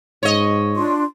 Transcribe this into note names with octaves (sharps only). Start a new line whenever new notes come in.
G#2 C#5 D#5
D4 F4 C6